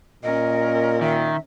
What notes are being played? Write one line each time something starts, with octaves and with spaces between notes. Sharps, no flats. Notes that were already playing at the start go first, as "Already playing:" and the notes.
A#2 C#4 A#4 D#5
D#3 E5